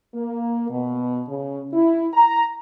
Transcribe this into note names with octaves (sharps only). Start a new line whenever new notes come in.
A#3
B2
C#3
E4
A#5